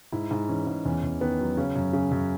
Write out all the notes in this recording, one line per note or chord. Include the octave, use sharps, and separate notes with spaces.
G#2 E4
G#2
E3 C#4
G#2
E2 C#4
E2
D#3 B3
F#3
C#3 C#4
F#2
C#3
F#2